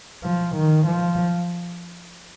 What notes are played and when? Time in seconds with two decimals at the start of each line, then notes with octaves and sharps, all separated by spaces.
0.24 F3
0.56 D#3
0.87 F3